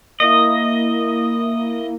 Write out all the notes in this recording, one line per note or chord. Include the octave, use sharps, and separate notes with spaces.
A#3 E4 D#5